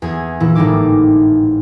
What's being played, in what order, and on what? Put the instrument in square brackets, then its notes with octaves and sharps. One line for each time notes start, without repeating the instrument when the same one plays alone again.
[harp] E2 G#4 G#6
A#2 E3 E4
G#1 A2 G3 D#4 E4 D6